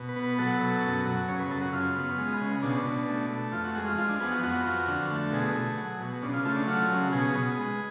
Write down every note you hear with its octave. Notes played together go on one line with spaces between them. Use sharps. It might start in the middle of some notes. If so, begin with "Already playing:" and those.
Already playing: B2
B4
B3
B4
F#3 A4
B2
F#2
F#3
C#3 C#5
B4
F#2 A4
F#4
C#3 F4
B3
G#3
C#3
B2 D4
B2
A3
A3
F2 F4
F#4
G#3 F#4
F4
F3 F4
D4
B3 G#4
F#4
F2 F#4
F3
D3
A3
B2 G#4
A3
F#3
B2
C#3 D4
F4
A3 F4
D4
F#3 F4
C#3
B2 G#4
B3
G#3